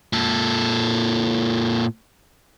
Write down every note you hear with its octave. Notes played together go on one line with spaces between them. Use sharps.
A#2 A4